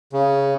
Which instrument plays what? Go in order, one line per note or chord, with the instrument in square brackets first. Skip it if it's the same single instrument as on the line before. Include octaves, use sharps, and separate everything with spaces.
[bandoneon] C#3